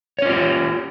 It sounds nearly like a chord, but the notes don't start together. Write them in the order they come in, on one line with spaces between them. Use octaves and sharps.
C#5 C#4 F4 G4